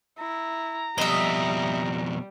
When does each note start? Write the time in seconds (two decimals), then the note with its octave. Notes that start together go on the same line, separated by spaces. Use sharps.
0.19 E4 A#5
0.98 F2 B2 G3 D#5 E5